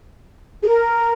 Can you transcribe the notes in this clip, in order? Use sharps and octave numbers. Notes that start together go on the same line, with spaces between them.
G#4
A#4